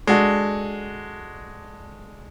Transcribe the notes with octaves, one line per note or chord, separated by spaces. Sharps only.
G#3 D4 F#4 A4